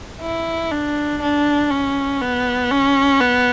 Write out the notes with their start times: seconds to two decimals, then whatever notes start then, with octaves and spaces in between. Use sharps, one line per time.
0.22 E4
0.72 D4
1.22 D4
1.71 C#4
2.22 B3
2.72 C#4
3.21 B3